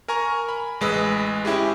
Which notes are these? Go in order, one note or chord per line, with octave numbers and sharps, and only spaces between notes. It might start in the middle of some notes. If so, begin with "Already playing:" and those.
A#4 G#5 A#5 C#6
B5
A1 G#3 B4 D#5 E6
C#4 E4 G4 G#4